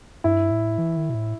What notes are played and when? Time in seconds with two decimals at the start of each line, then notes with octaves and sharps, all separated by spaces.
0.24 G2 E4
0.51 A2
0.78 E3
0.97 D#3
1.10 B2
1.15 A2